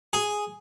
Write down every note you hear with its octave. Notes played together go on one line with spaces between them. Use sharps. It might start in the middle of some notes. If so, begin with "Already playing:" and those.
G#4